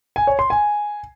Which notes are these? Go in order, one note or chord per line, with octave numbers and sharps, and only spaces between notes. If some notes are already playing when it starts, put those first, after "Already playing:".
G#5
C#5
C6
G#5